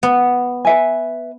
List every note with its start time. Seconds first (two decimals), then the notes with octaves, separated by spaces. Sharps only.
0.03 B3
0.65 B4 E5 G#5